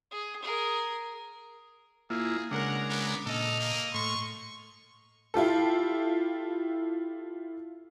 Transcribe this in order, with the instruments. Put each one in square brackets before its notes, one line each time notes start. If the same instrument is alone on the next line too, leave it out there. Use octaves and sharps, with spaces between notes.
[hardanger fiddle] G#4
G#4 A#4
[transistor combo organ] A#3 E4 F4 [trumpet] G#4
[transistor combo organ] C#3 G#3 D4 [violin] A#4 A#5 [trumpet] F#5
[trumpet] B3
[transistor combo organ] A#2 [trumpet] A4 [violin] D#5 F6
[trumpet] A#3
[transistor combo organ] A2 [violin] C6 [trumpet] C#6
[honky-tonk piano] E4 F4 G4 A4